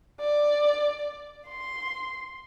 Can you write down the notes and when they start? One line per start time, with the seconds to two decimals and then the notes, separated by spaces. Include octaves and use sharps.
0.20 D5
1.47 C6